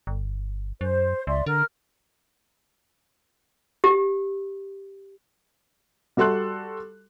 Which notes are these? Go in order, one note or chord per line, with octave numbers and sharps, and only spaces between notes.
G1
F#2 C5
C#2 D5 E5 C6
D3 A#4 F6
G4
G3 F#4 A4 C6 F#6